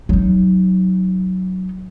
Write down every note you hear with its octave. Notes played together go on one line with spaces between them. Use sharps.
F#3 D#4